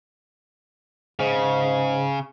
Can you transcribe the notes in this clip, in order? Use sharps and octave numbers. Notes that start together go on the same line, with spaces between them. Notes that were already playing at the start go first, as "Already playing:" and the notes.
G#2 C#3